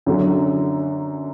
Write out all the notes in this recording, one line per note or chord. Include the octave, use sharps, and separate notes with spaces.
F#2 D3 F#3